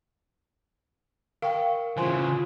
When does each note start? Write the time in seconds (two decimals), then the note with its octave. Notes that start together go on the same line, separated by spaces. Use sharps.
1.42 A#4 F5 G5 C#6
1.97 C#3 E3 F4 C5 G#5 C6